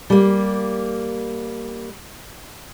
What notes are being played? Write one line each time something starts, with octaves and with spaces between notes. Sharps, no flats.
G3 A#3